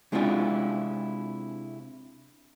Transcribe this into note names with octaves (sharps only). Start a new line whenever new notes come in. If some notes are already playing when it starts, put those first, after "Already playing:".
C3 G#3 C4 D4 E4 F4